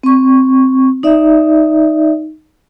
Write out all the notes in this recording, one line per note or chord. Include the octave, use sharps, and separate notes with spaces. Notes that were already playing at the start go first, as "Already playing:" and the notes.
C4 C#6
D#4 D5 E5